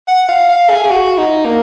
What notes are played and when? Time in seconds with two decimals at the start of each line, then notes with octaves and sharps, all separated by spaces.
0.08 F#5
0.29 F5
0.49 F5
0.70 G#4
0.84 G#4
0.90 F#4
1.18 D#4
1.46 A#3